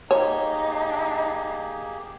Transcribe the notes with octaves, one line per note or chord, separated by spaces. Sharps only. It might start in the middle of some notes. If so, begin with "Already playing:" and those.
A#3 D#4 G4 G#4 C#5